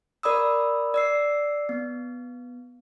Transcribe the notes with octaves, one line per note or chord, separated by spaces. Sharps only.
A#4 D5 B5 D#6 E6
D5 E6 C7
B3